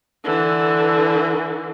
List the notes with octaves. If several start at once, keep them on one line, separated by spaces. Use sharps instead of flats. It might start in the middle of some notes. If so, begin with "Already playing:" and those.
D3 E3